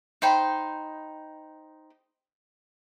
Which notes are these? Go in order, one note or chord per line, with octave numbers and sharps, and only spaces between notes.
D#4 C5 G5 B5